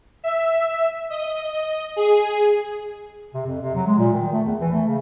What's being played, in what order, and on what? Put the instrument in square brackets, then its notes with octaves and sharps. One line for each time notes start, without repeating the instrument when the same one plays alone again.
[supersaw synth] E5
D#5
G#4
[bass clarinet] C3
F2
C3
F#3
G#3
A#2
D#3
A3
E2
E3
A3
C#3